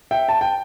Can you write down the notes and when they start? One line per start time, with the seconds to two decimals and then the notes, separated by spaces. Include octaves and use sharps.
0.11 E5 G5
0.29 A5
0.41 G5